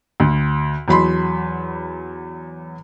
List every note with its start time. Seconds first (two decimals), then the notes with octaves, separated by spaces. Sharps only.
0.20 D2
0.88 E2 F#3 B5 C6